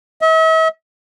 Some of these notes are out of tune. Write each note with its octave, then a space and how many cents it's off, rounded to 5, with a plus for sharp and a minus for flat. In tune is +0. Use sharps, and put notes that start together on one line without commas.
E5 -45